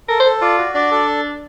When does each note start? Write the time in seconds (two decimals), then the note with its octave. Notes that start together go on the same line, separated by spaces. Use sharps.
0.08 A4 A#4
0.20 C5
0.25 A4
0.41 F4 D5
0.58 F#4
0.75 D4 D5
0.91 A4